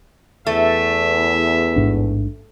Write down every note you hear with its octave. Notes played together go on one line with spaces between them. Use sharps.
E2 A3 E5
A1 G#2 D4